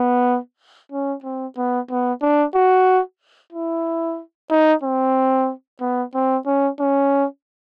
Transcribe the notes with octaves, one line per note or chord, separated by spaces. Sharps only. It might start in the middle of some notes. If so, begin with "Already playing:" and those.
Already playing: B3
C#4
C4
B3
B3
D4
F#4
E4
D#4
C4
B3
C4
C#4
C#4